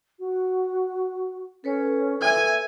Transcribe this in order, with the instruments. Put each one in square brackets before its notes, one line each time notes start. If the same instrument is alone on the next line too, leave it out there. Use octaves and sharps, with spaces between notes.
[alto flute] F#4
[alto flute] C#4 [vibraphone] A4 B4 C#5
[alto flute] E5 [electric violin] G#5